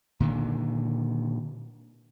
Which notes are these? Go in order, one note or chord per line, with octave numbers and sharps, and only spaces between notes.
A#2 D3 D#3